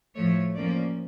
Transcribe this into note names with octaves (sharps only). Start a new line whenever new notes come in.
A2 F3 A3 C#5
F3 A#3 C#4 D5